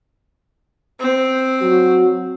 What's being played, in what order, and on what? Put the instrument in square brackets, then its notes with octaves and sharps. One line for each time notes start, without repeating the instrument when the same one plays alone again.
[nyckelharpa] C4
[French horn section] F#3 F#4